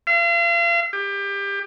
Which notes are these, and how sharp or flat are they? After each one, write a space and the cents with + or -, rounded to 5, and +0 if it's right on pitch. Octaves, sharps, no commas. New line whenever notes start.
F5 -40
G4 +25